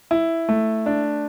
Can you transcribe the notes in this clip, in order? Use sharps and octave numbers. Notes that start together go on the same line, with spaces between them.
E4
A3
D4